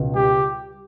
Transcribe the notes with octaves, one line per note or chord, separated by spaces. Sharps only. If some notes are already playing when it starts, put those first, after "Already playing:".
Already playing: C#2 B2
G3 G4